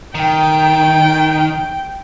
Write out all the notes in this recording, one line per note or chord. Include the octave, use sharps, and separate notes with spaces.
D#3 G5